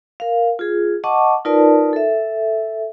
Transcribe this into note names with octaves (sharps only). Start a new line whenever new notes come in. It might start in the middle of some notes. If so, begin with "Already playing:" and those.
A#4 F5
F4 G#4
D#5 F#5 A5 C#6 D6
D#4 F4 A#4 B4 D5 A5
A4 E5